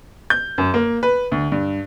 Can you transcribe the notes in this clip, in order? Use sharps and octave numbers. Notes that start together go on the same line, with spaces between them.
G6
F#2
A#3
B4
D2
G2